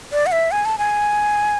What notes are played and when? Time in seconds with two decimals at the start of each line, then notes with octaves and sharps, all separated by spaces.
0.12 D5
0.26 F#5
0.32 E5
0.51 G#5
0.65 A5
0.78 G#5